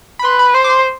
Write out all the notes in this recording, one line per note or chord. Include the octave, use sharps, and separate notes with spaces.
B5
B4 C6
B5
C5 C6
D6
C6